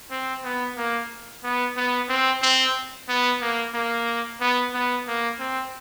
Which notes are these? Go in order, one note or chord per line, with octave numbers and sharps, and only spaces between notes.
C4
B3
A#3
B3
B3
C4
C4
B3
A#3
A#3
B3
B3
A#3
C4